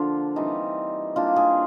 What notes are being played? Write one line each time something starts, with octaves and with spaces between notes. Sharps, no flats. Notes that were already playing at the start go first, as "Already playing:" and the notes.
Already playing: D3 F3 A#3 D4 F4
E3 G3 C4 D#4
E3 G3 A#3 D4 F4
G#4